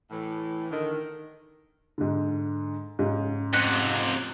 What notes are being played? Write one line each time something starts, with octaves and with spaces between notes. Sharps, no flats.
A2 E3
D3 D#3
G#2 D3
G#2 C#3
F2 C3 F#5